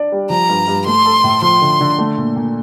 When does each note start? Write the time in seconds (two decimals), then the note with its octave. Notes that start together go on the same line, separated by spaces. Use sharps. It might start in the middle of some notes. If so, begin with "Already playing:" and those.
Already playing: D4 D5
0.12 G3
0.30 F3 A#5
0.49 G2
0.68 G2
0.86 A3 C6
1.06 A4
1.24 A2
1.42 F3 C6
1.62 D3
1.80 D3
1.99 A3
2.17 A#2
2.36 A#2